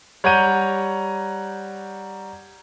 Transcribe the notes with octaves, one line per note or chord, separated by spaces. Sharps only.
G3 C#5 F#5 A#5 G6 D#7